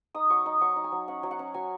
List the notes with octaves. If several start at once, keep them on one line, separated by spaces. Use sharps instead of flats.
D#4 D#6
F#3 C#6
D#4 D#6
F#3 C#6
D#4
G#5
F#3
C#4 F#5
F#3
F#5
C#4
F#3 G#5